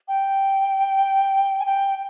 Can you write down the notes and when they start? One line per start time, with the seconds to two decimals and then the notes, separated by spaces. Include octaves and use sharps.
0.08 G5
1.59 G#5
1.66 G5